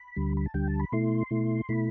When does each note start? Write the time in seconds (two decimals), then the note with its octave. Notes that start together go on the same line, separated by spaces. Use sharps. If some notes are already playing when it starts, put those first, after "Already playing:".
Already playing: B5
0.16 D2 D3 G3
0.37 B5
0.46 A5
0.54 D2 D3 G3 G5
0.67 A5
0.80 B5
0.92 B2 A3 E4 C6
1.31 B2 A3 E4
1.69 B2 A3 E4 B5